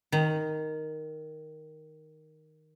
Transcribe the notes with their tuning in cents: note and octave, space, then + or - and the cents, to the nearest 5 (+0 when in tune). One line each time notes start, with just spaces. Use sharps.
D#3 +0 A#5 -30